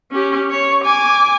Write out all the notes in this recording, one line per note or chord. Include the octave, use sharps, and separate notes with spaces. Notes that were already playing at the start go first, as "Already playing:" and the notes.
C#4 G4
C#5
G#5 D6